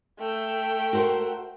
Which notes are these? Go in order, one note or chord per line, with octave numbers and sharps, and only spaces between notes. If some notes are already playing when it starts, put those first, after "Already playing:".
A3 G5
F#4 A#4 C5